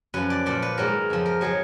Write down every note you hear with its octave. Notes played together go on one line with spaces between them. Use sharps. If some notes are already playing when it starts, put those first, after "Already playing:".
F#2 F3 B4
D5
A#2 F3 D5
B4
G#2 D#3 F#3 A#4
F2 F3
A#4
D#3 F#3 G#4